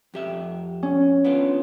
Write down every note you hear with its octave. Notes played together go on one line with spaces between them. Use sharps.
F2 G4 E5
C#4
B3 D4 F4